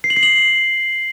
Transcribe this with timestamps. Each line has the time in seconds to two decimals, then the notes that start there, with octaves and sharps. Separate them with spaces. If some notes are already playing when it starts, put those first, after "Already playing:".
0.04 C7
0.10 F#7
0.16 C7
0.23 F#7